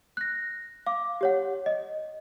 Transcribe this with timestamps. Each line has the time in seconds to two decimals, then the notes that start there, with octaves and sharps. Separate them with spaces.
0.17 F#6 A#6
0.87 F5 D6
1.21 G4 C#5 F#5
1.66 D#5